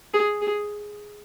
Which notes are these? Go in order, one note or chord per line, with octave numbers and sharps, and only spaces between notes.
G#4
G#4